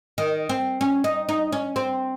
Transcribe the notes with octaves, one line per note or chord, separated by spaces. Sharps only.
D#3
C4
C#4
D#4
D#4
C#4
C4